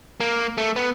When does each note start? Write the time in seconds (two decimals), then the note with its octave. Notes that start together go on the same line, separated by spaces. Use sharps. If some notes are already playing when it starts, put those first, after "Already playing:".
0.20 A#3
0.58 A3
0.76 B3